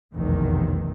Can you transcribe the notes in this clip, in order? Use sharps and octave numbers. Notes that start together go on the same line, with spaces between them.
F1 B1 E2 D#3